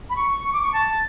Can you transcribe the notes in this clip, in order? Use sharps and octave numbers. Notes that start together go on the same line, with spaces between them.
B5
C#6
C#6
D6
C#6
A5